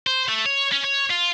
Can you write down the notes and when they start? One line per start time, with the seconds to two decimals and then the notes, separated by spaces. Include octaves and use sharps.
0.07 C5
0.29 A3
0.46 C#5
0.72 C#4
0.84 C#5
1.10 F4